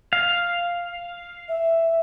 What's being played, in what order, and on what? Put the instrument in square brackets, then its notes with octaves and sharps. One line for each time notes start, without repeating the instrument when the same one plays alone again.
[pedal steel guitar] F5
[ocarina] E5